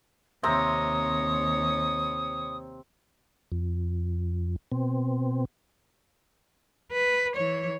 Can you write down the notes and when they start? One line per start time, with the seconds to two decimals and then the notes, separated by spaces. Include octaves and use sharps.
0.43 D#2 C3 C4 C#5 A#5 D#6
3.52 F2
4.72 B2 C4
6.92 B4
7.36 E3 C#5